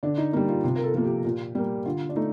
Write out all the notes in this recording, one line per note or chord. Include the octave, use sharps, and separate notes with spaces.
D3 D4
D#4
G3 A#3 D#4
F4
C3 F4
A#4
A4
F3 A#3 A4
G4
A#2
G3 A#3
D3 F4
D4
A3 D#4